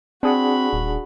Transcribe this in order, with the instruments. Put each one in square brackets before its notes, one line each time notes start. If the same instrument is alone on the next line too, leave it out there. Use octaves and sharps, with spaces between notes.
[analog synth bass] C4 [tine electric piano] D4 G#4 F#5 [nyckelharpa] F#4 B5
[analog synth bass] D#1